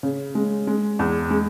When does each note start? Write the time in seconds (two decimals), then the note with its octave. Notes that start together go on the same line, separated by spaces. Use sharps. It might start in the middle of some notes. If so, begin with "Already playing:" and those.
0.03 C#3
0.35 G#3
0.67 G#3
0.99 E2
1.31 G#3